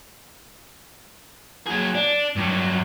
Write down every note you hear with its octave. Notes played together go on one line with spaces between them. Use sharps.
F#3 G#4
D4
G2 F#3